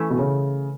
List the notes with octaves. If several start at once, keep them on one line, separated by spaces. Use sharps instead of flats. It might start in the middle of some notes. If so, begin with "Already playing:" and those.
Already playing: E3 A3 C#4 E4
B2
C#3